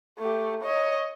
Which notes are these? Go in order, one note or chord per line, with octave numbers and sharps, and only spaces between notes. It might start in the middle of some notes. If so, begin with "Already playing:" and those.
A3 G4
C#5 D#5